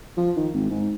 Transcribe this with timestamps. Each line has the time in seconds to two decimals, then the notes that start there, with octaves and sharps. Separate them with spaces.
0.17 F3
0.37 D#3
0.53 G#1
0.70 G#2